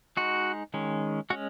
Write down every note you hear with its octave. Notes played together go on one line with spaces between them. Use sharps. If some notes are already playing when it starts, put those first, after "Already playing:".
G#3 D#4 F#4
D#3 G#3 C#4
G#3 C#4 F#4